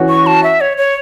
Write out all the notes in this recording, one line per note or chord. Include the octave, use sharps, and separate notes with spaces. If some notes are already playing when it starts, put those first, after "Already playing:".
Already playing: E3 C#4 F#4
C#6
A5
E5
C#5
C#5